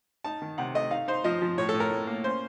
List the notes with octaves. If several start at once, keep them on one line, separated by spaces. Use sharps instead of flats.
D#4 A5
D#3
C3 F#5
A3 D#5
D#4 F5
D#4 C5
F3 D#5
F3
A2 C#5
A4
A2
A#4
A2
A#3
C#4 C5